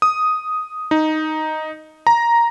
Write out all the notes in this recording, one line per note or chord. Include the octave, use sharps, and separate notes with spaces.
D#6
D#4
A#5